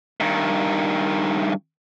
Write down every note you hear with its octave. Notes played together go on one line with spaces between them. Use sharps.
G2 D#3